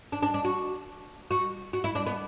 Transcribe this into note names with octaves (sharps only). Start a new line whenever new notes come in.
D4
D4
D4
F#4
F#4
F#4
E4
D4
B3